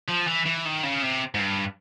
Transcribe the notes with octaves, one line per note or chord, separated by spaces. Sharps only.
F3
E3
E3
D#3
C#3
C3
G#2
G2